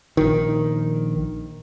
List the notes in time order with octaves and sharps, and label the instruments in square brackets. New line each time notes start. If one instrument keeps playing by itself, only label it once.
[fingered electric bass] A#1 D#3